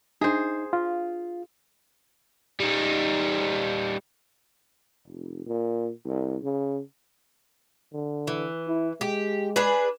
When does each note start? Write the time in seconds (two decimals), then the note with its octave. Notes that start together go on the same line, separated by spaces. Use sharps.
0.21 D4 D#4 G#4 C5 E5
0.73 F4 F5
2.60 G3 D#4
5.08 F1
5.46 A#2
6.05 C2
6.43 C#3
7.93 D3
8.27 E3
8.68 E4
9.01 G#3 G4
9.56 D4 G#4 B4